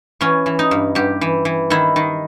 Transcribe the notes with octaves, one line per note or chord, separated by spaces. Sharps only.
E3 C#4
E3
D#4
G2
G2 G4
E3
E3
D#3 E4
D#3